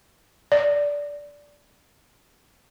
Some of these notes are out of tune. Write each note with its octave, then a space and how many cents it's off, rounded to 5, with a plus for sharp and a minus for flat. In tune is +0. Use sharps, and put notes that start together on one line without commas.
D5 -15